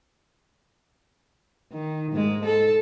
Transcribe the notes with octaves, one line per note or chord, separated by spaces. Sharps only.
D#3
G#2 G#3
A4